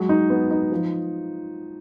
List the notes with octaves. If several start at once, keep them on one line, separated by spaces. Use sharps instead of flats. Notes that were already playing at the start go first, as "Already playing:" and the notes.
Already playing: F#3 G#3
D#4
B3
D#4
F3